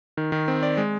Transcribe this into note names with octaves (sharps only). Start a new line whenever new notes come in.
D#3
D#3
C4
D5
G#3